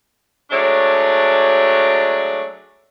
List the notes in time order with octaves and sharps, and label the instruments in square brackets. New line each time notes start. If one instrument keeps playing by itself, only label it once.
[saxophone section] F#3 G#3 A3 D4 C#5 D5